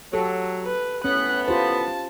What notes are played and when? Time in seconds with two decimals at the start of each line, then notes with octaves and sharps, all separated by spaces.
0.13 F#3 G4 A4
0.64 B4
1.04 A2 B3 C#4 F#6
1.48 F4 G4 C5 A5